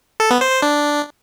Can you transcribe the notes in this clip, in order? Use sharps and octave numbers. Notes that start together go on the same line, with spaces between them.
A4
B3
C5
C5
D4